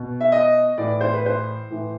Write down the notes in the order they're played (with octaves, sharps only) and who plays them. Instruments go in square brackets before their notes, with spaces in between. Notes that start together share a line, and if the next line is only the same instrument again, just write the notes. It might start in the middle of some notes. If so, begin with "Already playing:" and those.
Already playing: [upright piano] B2
E5
D#5
A2 E3 D5
C5
B4
C5
A2 E3